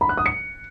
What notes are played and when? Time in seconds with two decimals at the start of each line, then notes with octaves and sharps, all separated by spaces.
0.01 B5
0.09 F#6
0.17 D#6
0.26 C#7